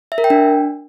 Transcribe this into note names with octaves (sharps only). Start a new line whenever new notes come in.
E5
A#4
G5
D4